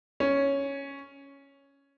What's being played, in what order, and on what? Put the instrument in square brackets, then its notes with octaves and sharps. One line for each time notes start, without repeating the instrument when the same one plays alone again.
[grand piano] C#4